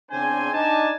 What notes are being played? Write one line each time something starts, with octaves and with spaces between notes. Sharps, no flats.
E2 C#3 C4 D4 C5 G#5
D4 D#4 G#5 A5